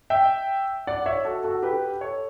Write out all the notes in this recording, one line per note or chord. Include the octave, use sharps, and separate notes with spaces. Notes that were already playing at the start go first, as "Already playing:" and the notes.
E5 G5
D5 F#5
C#5 E5
F#4 A4
F#4 A4
G4 B4
A4 C#5